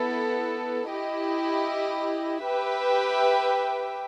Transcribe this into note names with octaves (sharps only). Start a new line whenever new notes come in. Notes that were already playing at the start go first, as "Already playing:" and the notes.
Already playing: B3 E4 A4
E4 G4 D#5
G4 B4 E5 G5